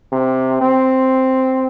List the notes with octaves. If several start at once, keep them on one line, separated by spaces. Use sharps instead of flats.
C3
C4